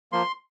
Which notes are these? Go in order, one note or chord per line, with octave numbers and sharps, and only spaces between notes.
F3 A#3 C6